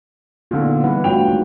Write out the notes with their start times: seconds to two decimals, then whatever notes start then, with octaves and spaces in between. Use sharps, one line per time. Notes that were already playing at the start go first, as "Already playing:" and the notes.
0.51 A#2 D3 B3 D#4 F4
0.84 E3 G3 B4 F#5
1.04 A1 D4 F4 F#4 G5 F7
1.28 D#3 G#3 A#3